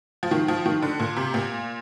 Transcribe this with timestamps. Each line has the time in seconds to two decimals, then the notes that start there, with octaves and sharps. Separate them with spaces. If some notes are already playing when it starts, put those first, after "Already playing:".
0.23 F3
0.31 D#3
0.48 F3
0.66 D#3
0.82 D3
1.00 A#2
1.16 C3
1.34 A#2